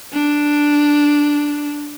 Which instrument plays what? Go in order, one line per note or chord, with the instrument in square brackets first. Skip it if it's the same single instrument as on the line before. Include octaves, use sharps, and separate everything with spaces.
[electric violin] D4